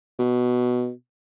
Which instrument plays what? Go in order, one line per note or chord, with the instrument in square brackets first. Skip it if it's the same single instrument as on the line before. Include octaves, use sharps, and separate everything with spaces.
[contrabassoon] B2